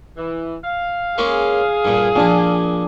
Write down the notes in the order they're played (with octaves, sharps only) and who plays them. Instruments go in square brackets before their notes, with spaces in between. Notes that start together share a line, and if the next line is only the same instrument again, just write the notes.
[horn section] E3
F5
[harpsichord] G#3 A#3 C#4 [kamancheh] G#4
[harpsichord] G2 A#2
[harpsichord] A#2 F3 [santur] D4 G#5